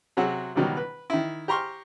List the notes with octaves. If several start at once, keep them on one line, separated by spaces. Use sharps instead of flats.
C3 F#3 G#4 F#5 E6
C#2 B2 D#3 F#3 G3
B4
D#3 E4
G4 A#5 C6 C#6 F6